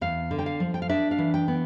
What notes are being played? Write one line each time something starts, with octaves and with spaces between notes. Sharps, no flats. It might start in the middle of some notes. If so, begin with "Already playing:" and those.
E2 F5
D3
G5
F5
F3
G5
F5
D4 E5
F5
E3
G5
B3